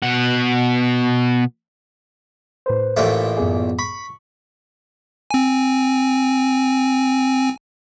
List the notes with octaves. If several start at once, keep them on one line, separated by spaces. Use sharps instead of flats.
B2 F#5
A2 B4 C5
A1 A#2 A3
F#2 B3 G#4
B5 C#6
C4 G#5